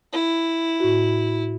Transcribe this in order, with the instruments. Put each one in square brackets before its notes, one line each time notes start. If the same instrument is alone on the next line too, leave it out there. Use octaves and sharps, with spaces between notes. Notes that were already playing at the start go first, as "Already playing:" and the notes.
[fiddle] E4
[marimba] A2 F#4